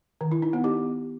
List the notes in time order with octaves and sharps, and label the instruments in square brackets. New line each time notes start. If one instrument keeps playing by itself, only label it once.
[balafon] D#3
E4
D#4
B3
G4